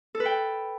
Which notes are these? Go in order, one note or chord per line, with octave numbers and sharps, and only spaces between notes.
A4
B4
G5